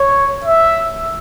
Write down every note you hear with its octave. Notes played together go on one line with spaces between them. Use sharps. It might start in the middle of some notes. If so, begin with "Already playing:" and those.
Already playing: C#5
E5